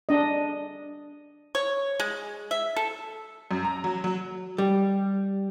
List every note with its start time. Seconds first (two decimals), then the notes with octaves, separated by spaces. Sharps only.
0.09 D4 D#5
1.55 C#5
2.00 G#3
2.51 E5
2.76 A4
3.51 F#2
3.65 A#5
3.84 F#3
4.04 F#3
4.58 G3